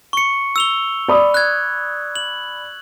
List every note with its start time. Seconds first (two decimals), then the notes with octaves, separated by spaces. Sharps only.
0.13 C#6 C#7
0.56 E6 F7 G7
1.08 D5 B5 D#6
1.34 F#6 G#6
2.16 F#7